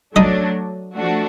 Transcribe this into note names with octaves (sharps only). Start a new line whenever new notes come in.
F#3 A3 D4 D#4 D#5
F3 A3 D4 F#4